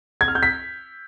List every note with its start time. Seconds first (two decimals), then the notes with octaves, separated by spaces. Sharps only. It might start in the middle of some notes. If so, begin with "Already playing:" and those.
0.21 G#6
0.28 F6
0.35 G6
0.43 B6